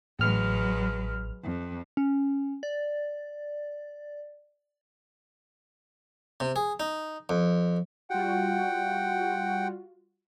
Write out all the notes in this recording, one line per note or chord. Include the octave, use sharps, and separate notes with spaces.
A1 F#3 G#3 B4 F6
F2
C#4
D5
C3
G#4
D#4
F2
G3 F4 F#4 F#5 G5